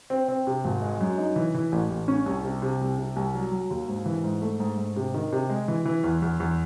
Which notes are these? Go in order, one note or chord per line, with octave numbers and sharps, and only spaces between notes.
C4
C4
C3
G#1
G#3
F#2
D#4
E3
E3
A1
A1
C#4
C2
C3
C3
C2
C3
C2
F#3
F#3
D#2
G#2
E3
G#2
A3
G#2
G#2
C3
D#3
C3
G#3
E3
E3
E2
E2
E2